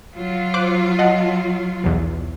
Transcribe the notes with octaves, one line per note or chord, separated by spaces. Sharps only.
F#3 F4
C5 D6 F#6
D#5 F#5 A5
B1 E2